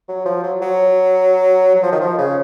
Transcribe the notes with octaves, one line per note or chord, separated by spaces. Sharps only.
F#3
F3
F#3
F#3
F#3
F3
D#3
F3
C#3